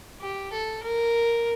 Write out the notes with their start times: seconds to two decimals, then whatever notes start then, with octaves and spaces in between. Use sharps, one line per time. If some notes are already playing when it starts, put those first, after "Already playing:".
0.21 G4
0.52 A4
0.83 A#4